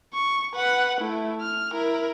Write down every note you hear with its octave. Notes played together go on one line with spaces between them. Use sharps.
C#6
B4 F#5
A3 E4
F6
E4 A#4